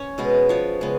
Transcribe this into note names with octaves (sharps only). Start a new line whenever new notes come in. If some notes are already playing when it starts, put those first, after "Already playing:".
Already playing: C#4 C#5
B2 G#3 B3
F3 B3 C#5
C#3 G#3 B3